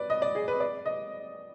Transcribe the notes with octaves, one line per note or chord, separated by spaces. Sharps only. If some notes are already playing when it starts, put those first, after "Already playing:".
Already playing: B4 D5
D#5
D5
G#4
B4
D5
D#5